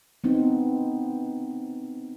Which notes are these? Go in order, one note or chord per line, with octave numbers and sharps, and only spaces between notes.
B3 C4 D#4